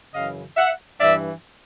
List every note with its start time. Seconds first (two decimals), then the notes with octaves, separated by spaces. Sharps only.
0.13 F#2 C#3 E3 D#5 F5
0.57 E5 F#5
1.00 G2 E3 D5 E5